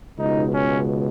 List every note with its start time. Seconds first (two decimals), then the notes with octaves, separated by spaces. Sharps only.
0.19 C#2 B2 D#4
0.54 C#4